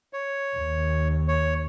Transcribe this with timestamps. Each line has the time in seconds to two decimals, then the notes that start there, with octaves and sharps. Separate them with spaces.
0.13 C#5
0.55 D#2
1.28 C#5